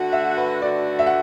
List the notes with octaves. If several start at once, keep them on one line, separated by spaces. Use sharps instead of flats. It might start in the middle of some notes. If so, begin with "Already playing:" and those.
Already playing: D3 A3 F#4 F#5
E5
B4
D3 A3 F#4 D5
E5
F#5